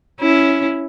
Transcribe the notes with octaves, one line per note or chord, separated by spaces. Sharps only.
C#4 E4